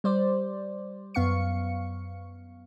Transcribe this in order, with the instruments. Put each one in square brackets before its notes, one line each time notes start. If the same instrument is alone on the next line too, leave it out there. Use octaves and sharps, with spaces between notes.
[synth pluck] G3 C5 D5
F#2 B3 F5 C#6 C#7